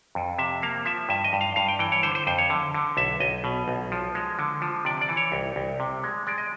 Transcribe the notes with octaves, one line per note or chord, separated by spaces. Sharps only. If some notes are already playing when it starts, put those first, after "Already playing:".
F2
C3 E5
A#3 F5
F3 E5
G2 E5
D#5
G2
F5
G2 F5
G5
E3 G5
C#5
D3 C5
C5
F2 C5
C#5
D3
D3
B1 E5
B1 D#5
B2
B1
F3
G#3
D3
F3
C3 D5
D5
E3
C#5
C2
C2
C3
G#3
G#3 D5
D#5